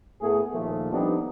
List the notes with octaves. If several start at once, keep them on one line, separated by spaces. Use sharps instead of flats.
A2 A3 B3 G#4
D#2 A#2 F3 A3 A#3
F3 G3 B3 C4 D4 D#4